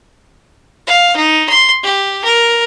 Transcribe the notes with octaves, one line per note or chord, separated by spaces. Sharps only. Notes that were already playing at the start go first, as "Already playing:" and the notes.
F5
D#4
C6
G4
A#4